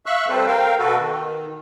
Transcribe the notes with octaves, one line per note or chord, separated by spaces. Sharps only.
E5 F5 C#6 E6 F#6
G3 C4 A4 B4 C5
A#4 F5 G5
B2 F#4 A4 B4
D#3